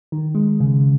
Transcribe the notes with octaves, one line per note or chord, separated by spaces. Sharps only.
D#3
G#3
C#3